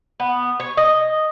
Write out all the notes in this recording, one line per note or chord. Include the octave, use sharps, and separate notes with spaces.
B3
C#5
D#5